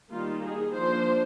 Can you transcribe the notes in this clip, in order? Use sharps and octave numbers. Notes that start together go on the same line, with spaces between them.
D#3 G3 A#3 D#4 F4
G#4
F3 A#3 D4 C5